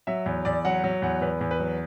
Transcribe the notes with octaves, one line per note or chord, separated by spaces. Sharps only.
F#3 E5
E2
E2 D5
F#3 F#5
F#3
E2 F#5
E2 B4
E2
B4
F#3